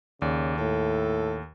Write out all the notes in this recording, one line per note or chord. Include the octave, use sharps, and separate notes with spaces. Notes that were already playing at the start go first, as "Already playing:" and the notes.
D#2 C#3 D5
A2 A4